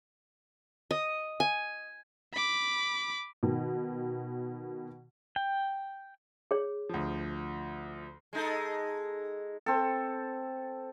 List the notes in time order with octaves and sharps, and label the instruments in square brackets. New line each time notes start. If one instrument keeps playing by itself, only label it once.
[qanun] D#5
G#5
[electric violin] B5 D6
[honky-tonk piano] B2 D#3
[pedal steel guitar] G5
[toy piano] G#4 C#5
[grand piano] D2 F3
[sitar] G#3 D#4 A4
[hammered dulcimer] C4 A4